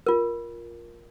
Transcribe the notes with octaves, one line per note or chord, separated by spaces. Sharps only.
F4 A#4